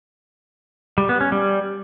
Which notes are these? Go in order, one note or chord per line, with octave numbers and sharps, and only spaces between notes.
G3
B3
C#4
G3